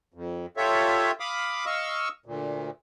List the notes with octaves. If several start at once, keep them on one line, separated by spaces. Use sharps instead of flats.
F2
F4 G4 A4 C#5 E5
F5 B5 D6 D#6
D#5 F5 C#6 E6
D2 A#2